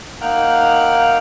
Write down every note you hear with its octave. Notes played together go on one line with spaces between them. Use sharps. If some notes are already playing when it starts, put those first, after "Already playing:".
A#3 D#4 F#5 G5 F6